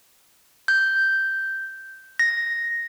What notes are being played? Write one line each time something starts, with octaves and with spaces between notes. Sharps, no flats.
G6
A#6